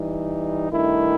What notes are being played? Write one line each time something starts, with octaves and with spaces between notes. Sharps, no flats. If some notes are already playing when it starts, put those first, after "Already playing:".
Already playing: E3 G3 D#4
G2 D#3 A3 E4